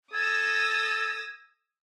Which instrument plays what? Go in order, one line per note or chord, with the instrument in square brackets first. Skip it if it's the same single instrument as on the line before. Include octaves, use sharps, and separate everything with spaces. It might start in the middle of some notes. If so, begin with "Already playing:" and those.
[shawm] A4 [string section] D#6 E6 A#6 [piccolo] G#6